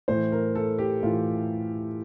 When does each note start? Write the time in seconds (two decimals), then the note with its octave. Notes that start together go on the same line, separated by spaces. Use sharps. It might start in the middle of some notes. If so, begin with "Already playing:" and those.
0.08 A2 E3 C5
0.32 A#4
0.55 A4
0.78 G4
1.03 A2 E3 F4